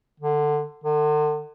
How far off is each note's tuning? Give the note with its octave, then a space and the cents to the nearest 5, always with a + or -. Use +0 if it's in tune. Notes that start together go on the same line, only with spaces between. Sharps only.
D3 +20
D3 +40